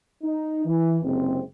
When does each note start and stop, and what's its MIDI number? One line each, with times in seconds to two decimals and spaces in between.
0.23 0.62 63
0.66 0.98 52
1.03 1.41 30
1.03 1.41 48
1.03 1.41 56
1.03 1.41 60